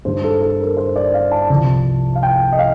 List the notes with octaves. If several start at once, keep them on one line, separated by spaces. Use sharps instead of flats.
G2 D#3 G3 C5
A4
A4
A#4
C5
D5
F5
A5
C2 C3 F3
F5
G5
D#5
F5